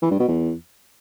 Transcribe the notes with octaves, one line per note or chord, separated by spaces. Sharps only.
E3
G2
B2
E2